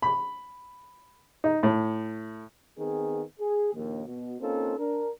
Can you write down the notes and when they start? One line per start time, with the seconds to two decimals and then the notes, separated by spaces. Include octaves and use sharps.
0.02 B5
1.44 D#4
1.63 A2
2.78 D#3 B3 C4 G#4
3.40 G#4
3.74 A#1 D#2
4.07 B2
4.41 A#3 C4 C#4 D#4 F4 A4
4.78 D4 A#4